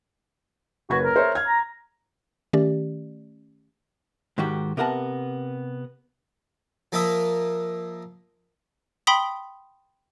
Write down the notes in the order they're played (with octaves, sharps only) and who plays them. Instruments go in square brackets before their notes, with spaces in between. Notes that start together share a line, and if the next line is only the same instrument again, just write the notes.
[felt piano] F#1 B4 G#6 [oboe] F#4
[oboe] A#4
[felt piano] C5 C#5 E5
F6 G#6
[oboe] A#5
[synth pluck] D#3 A3 C#4 G4 D5
[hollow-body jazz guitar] G#2 D#3 F#4 G4
C3 B3 A#4 F#5 A5
[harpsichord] F3 A#3 F4 D#5 E5
[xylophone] G5 B5 C6 D#6 B6